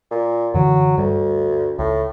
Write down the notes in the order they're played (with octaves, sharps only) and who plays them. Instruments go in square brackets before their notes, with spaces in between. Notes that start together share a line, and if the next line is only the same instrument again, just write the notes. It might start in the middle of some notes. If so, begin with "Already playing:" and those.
[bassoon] A#2
[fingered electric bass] F#2 D3 E3 [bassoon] F#3
[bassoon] D2 [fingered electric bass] G2
[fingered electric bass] C#2 [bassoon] A2